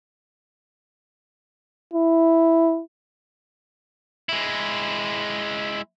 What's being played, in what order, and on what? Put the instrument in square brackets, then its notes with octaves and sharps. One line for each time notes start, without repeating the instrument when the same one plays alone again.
[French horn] E4
[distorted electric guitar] G#3 E4